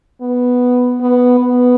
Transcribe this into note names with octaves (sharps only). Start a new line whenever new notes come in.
B3
B3
B3